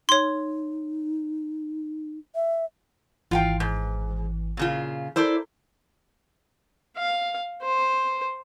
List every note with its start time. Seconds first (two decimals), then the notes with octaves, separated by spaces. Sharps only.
0.09 D#4 C#5 C6
2.35 E5
3.31 G#1 E3 F4 F5 G5
3.60 G#2
4.57 A#2 C#3 F4
5.16 E4 A4 A#4 C5 D5
6.97 F5
7.62 C5